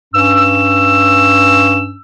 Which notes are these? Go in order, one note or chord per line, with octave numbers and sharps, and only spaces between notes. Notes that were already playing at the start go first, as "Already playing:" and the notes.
G2 C#4 E6